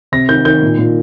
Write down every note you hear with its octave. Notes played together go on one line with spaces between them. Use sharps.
C3 A#6
D#3 G6
D#3 G6
A#2
A#2